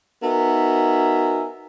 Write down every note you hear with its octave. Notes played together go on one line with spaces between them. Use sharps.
B3 D#4 F#4 A#4 E5 G#5